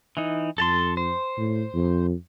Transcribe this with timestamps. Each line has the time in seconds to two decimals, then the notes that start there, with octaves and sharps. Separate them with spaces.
0.17 E3 D#4
0.58 F2 A4 A5 C6
0.97 C5
1.37 A2
1.74 F2